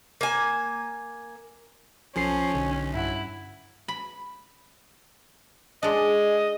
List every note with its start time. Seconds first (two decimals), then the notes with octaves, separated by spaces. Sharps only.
0.21 A#3 G#5
2.16 B1 F3 C#4 A4 C7
2.54 B1 D3
2.94 G2 E4 F#5
3.88 B5
5.83 G#3 D4 D#5